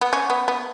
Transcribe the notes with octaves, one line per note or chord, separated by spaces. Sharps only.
B3
C#4
B3
B3